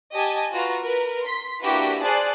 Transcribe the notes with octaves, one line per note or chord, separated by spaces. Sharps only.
G4 D#5 G#5 A5
F4 F#4 B4 A#5
A#4 B4
C6 B6
A#3 D4 E4 F#4 G4 B4
G#4 C5 D5 A5 F#6 C7